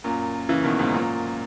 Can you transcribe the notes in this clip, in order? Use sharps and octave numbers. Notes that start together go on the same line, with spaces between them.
F#2 A#2
C#3 E3
B2 D#3
G#2 B2
F#2 A#2